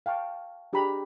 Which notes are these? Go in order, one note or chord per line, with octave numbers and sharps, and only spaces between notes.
F5 G5 A5 C#6
D4 G4 G#4 A#5 B5